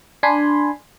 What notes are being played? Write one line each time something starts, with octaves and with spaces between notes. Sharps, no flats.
D4 G#5 B5 C6